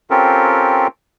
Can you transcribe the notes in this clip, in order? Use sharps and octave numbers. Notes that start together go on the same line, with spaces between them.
C4 C#4 F4 G4 A4 A#4